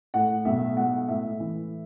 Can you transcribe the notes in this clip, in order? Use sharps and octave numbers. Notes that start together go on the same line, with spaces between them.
A2 F#5
B1 E5
G#3 F#5
A2 E5
E3